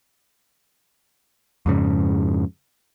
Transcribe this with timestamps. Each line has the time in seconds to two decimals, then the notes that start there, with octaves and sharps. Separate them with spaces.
1.66 F2 G#2 C#3